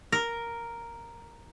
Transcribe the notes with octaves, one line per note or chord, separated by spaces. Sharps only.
A#4